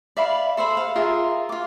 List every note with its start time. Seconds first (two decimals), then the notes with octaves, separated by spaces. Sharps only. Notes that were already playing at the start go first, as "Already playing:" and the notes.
0.17 D5 E5 F5 B5
0.57 A4 C5 E5 B5
0.77 F5
0.96 F4 G#4 A#4 E5
1.49 F4 D6